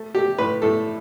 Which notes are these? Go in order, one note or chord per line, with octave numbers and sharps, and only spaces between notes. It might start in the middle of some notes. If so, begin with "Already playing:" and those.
Already playing: A3
A3 G4
A2 B4
A2 A4